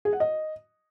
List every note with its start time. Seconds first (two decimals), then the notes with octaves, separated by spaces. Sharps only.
0.05 G#4
0.13 F#5
0.20 D#5